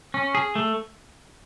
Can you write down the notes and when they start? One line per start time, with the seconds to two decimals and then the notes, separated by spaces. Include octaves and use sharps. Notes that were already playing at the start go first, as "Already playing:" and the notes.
0.14 C#4
0.35 G#4
0.55 A3